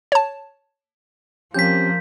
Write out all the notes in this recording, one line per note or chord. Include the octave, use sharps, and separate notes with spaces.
C#5 A5
F3 A#3 C4 C#4 G4 G6 B6